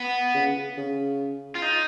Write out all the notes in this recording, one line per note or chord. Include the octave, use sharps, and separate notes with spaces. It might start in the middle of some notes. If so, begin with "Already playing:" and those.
Already playing: B3
C#3
C#3
F4
D#4